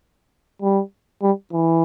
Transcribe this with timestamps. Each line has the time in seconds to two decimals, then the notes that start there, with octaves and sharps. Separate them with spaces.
0.62 G3
1.22 G3
1.52 E3